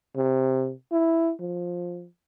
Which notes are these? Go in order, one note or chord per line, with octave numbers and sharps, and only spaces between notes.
C3
E4
F3